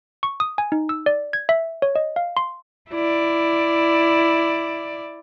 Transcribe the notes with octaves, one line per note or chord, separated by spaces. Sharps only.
C#6
D#6
G#5
D#4
E6
D5
G#6
E5
C#5
D#5
F5
C6
E4 D5